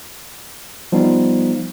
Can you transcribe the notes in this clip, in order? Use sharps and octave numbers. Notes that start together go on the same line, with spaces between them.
F3 G3 B3 D#4